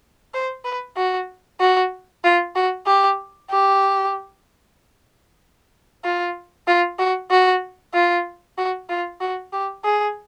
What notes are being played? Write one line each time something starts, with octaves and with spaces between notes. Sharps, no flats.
C5
B4
F#4
F#4
F4
F#4
G4
G4
F4
F4
F#4
F#4
F4
F#4
F4
F#4
G4
G#4